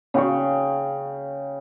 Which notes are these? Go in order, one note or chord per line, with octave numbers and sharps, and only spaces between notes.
C#3 G5 C#6